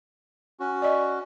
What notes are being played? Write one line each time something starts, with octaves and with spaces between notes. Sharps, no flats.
C#4 F#4
D5 D#5